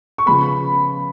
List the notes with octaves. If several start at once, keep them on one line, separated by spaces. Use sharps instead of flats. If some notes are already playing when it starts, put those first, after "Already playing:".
C#6
C#3 F3 G#3 B3 B5